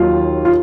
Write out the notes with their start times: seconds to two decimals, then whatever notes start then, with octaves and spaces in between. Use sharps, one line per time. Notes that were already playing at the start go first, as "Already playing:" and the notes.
Already playing: D#2 D#3 F#3 F4
0.45 F4